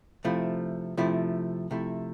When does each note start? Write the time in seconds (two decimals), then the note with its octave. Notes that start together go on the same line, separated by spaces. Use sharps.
0.24 C3 F3 A3 E4
0.98 C3 F3 A3 E4
1.71 C3 F3 A3 E4